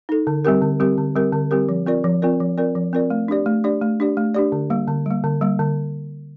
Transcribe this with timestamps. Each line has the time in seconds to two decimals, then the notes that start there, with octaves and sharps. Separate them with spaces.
0.09 D#4 A4
0.27 D3
0.45 G3 C4 G4 A#4
0.62 D3
0.80 G3 C4 G4 A#4
0.98 D3
1.15 G3 C4 G4 A#4
1.33 D3
1.51 G3 C4 G4 A#4
1.69 F3
1.86 C4 F4 A#4 D5
2.04 F3
2.22 C4 F4 A#4 D5
2.40 F3
2.58 C4 F4 A#4 D5
2.75 F3
2.93 C4 F4 A#4 D5
3.10 A3
3.28 D4 G4 D5
3.46 A3
3.64 D4 G4 D5
3.82 A3
4.00 D4 G4 D5
4.17 A3
4.34 D4 G4 D5
4.52 D3
4.70 G3 A#3
4.88 D3
5.06 G3 A#3
5.24 D3
5.41 G3 A#3
5.59 D3